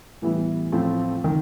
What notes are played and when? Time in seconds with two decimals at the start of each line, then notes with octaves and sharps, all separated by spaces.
0.22 A2 E3 G3 B3 E4
0.72 A2 F3 A3 C4
1.24 D#3